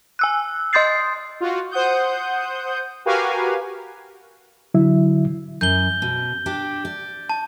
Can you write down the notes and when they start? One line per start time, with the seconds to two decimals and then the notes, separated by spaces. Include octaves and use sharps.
0.19 G#5 E6 F#6
0.73 D#5 C6 D#6 G6 A6 C7
1.40 F4 F#4
1.71 C5 F#5 D#6 G6
3.05 F#4 G4 A#4 B4 F5 G#5
4.74 D3 F#3 E4 E5
5.61 F#2 G6 G7
6.02 B2
6.46 D4 G4
6.85 D5
7.29 A5